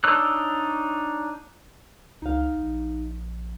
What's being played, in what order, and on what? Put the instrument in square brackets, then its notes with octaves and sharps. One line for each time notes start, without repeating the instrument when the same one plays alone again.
[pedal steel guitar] D4 D#4 C#5 E6 F#6
[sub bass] C#2 [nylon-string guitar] D#4 F5
[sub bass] A#1